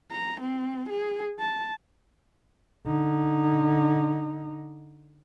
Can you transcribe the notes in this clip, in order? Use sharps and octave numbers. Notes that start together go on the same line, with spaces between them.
A#5
C4
G#4
A5
D3 D#4